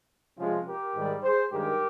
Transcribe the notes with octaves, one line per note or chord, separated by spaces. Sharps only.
C3 F3 G#3 C#4 F4
G4 A#4
G#2 D#3 G3
G#4 C5
G2 D#3 G#3 G4 A#4